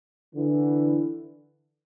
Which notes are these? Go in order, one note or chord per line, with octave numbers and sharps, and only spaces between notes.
D3 E3